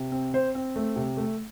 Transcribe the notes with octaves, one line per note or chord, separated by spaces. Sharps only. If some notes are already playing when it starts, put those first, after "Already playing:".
Already playing: C3
C4
C4 C5
C4
A3
C3
A3